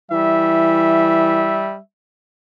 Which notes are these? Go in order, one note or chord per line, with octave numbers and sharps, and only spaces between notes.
E3 G3 E5